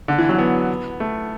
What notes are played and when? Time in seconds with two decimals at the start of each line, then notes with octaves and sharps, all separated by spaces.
0.08 D3
0.18 E3
0.29 F#3
0.38 B3
1.00 A3